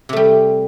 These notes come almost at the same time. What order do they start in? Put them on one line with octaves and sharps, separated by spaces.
C3 A3 G3